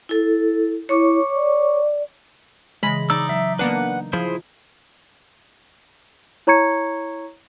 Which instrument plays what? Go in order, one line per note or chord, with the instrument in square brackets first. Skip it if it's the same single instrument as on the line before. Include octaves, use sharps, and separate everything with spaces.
[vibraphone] E4 A4
[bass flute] E4 [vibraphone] C#5 C#6 D6
[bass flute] D5
[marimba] C#3 E3 A#6 [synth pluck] G#3 [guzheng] B5
[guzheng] D#4 D5 [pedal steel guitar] E6
[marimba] F#3 [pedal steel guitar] E5
[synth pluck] A#3 B3 D4 [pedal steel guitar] B4 F#5
[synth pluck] F3 [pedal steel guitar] E4 G#4 C5
[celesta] E4 C#5 A#5 C#6 G#6 C#7